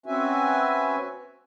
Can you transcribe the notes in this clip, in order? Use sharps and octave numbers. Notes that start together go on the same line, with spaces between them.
C4 C#4 F#4 B4 E5 G#5